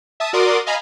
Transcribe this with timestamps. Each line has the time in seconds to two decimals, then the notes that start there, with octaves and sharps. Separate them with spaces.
0.20 E5 A5 D#6
0.33 F#4 A#4 D5 C6 D6 D#6
0.66 D#5 F5 G#5 A#5 B5